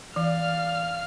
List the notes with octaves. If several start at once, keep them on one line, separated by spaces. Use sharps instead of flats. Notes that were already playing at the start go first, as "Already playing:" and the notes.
E3 D5 F5 F6